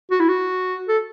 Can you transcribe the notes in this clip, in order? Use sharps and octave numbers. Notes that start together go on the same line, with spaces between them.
F#4
E4
F#4
A4